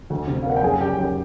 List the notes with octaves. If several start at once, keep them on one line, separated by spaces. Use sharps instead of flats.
D2
C3
F5
A#3 F#5
G5
F#2 G#4 G#5
C#3 G4 G5
F#2 G4 G5